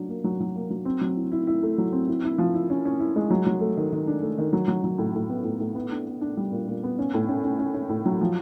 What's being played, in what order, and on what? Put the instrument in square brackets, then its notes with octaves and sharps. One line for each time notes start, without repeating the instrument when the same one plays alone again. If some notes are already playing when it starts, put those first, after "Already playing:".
Already playing: [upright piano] F#3 D4
A#3
F#3
F#3
A#3
F#3
C4
F#3
E4
E4
E4
A3
F#3
C4
E4
E4
F3
E4
C#4
C#4
E4
G#3
F#3
F#3
A3
D#3
D#3
D4
A3
D#3
F#3
F#3
F#3
A2
A2
B3
A2
A2
B3
D4
B3
D4
G3
A#2
A#2
B3
C#4
A2
C#4
C#4
C#4
C#4
A2
F#3
F3